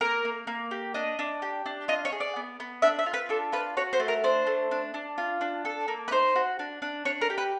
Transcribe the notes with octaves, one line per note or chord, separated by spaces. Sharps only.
A#3 A#4
A#3
A#3
G4
D4 D#5
D4
G4
D4
F4 D#5
C#5
G#4
D5
B3
B3
D4 E5
E5
F4
B4
D4 A4
F4 B4
F#4 C#5
C5
A3
A#4
D4 C5
A3
D4
D4
F4
D4
A4
A#3
B4
D#4 C5
F#4
D4
D4
D4 C#5
A#4
G4
B4